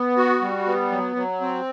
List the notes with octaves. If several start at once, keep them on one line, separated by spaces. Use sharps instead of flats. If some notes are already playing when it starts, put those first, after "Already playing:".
Already playing: B3
F#4
G3
B3
F#3
F#3
C4